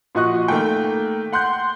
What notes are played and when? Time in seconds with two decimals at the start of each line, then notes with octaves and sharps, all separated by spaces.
0.15 A#2 F3 F#4 D#5 C#6 F#6
0.48 D#3 A3 A#3 G5
1.33 F#5 C6 F#6 G6